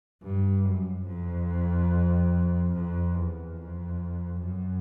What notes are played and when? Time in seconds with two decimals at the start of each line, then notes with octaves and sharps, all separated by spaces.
0.23 G2
0.65 F#2
1.07 F2
2.73 F2
3.15 E2
3.57 F2
4.40 F#2